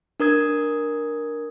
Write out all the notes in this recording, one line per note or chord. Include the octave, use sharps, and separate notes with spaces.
D4 A#4 D#6 G#6